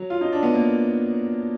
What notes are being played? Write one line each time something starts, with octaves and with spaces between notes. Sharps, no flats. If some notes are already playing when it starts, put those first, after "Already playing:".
Already playing: F#3
F4
D#4
D4
B3
A#3